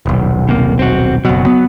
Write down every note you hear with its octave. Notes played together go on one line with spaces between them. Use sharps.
D#1 B1
C3 A#3
C4 F#4
F#1 B2 F#3
B3